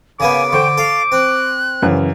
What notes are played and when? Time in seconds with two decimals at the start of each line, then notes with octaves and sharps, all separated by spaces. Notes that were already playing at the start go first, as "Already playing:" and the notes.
0.20 C#3 A#3 B3 G#5 D6
0.52 D3 C5 G5 C#6
0.78 A4 F5
1.12 C4 F#6
1.82 F#2 C#3 E3